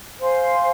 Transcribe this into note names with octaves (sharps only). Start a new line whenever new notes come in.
C5 F5 G#5 C6